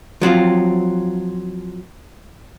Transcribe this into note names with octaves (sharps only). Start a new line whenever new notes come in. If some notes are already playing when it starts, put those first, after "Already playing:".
F3 F#3 C4 F4